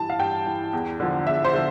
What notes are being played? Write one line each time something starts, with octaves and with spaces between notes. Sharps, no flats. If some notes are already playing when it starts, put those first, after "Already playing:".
Already playing: G2 E3 A5
F5
G2 G5
E3
E2
D3 F3
E2 E5
C5
D3 F3